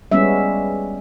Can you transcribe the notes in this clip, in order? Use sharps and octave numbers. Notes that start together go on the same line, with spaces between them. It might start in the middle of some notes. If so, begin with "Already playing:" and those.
G3 G#3 B3 C#4 E5